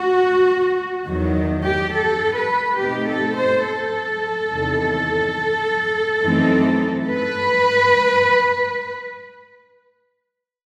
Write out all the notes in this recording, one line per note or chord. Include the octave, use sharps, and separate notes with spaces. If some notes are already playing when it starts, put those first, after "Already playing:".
Already playing: F#4
E2 D#3 F#3
G4
A4
B4
B2 A3 C4 D#4 G4
A4
C5
A4
E2 C3 D#3
F#2 E3 A3 C4 D#4
B4